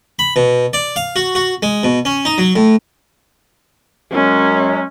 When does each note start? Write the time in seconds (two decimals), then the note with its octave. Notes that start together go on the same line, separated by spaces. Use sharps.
0.19 B5
0.36 B2
0.73 D5
0.96 F5
1.16 F#4
1.35 F#4
1.63 G#3
1.83 B2
2.05 C#4
2.25 D#4
2.38 F#3
2.56 A2
4.12 F#2 F#3 G#3 C#4